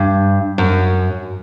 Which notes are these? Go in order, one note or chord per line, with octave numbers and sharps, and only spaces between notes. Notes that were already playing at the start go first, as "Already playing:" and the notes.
Already playing: G2
F#2